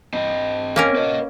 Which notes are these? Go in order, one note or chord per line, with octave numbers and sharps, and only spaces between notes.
C4 D#5
A#3 C#4 A#4
B4 D#5